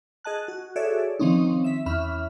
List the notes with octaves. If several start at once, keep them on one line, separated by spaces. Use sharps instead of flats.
G#4 D#5 A5 F#6
F#4
F#4 G#4 A4 C#5 D5 E5
D#3 F3 C4 C#4 D#4
E5 B6
E2 C#4 E5 B5 F6